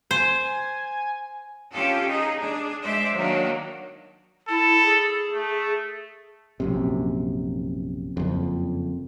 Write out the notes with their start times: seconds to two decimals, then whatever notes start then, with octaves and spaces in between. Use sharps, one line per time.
0.11 C5 G#5
1.72 C#4 F4 G4 A4
2.07 D#4 G#4
2.40 D4 G#4
2.81 G#3 C5 D5 E5
3.14 D#3 F#3 A#3 D4
4.48 E4 A4
4.83 G#4
5.30 A3
6.60 A#1 F#2 C3
8.17 F#1 F2